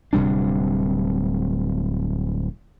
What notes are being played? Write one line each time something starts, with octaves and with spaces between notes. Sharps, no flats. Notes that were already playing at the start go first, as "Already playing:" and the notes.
D1 C3 G3 D4